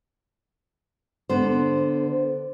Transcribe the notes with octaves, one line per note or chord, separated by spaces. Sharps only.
D3 B3 C5